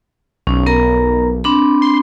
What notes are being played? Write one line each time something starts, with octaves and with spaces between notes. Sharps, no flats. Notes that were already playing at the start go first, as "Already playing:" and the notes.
B1 C#4
B3 A#4 A#5
C4 D4 B5
C6